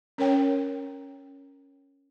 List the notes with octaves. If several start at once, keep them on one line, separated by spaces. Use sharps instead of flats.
C#4 A#4 C#5 G5